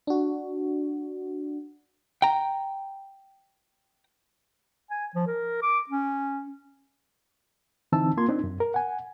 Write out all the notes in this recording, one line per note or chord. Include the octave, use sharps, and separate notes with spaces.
D4 F#4
G5 A#5
G#5
F3
A#4
D6
C#4
D3 E3 C4 D#4 A5 E6
A#3 F4 C6 G#6
C4 D4 D#4
F#2
A#4
F#5 G#5